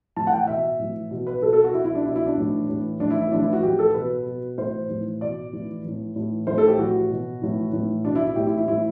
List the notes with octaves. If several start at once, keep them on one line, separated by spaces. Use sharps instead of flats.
A2 E3 A5
F#5
G5
B2 E5
A2 E3
B2
B4
B2 A4
A4
F#4
B2 E4
E4
D4
B2 E4
E4
D4
A2 E3
A2 E3
A2 E3 D4
E4
E4
A2 E3 D4
E4
F#4
A2 E3 G4
A4
B2 B4
B2
A2 E3 C5
A2 E3
B2 D5
A2 E3
A2 E3
A2 E3
A2 E3 C5
A4
G4
A2 E3 F#4
B2
A2 E3
A2 E3
B2 D4
E4
E4
A2 E3 G4
E4
E4
A2 E3 E4